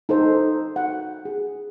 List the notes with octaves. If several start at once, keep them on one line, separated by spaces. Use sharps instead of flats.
D#4 A4 C5
F#5
G#4